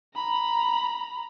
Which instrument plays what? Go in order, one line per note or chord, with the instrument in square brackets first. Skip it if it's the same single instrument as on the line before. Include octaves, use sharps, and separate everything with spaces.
[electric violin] A#5 B5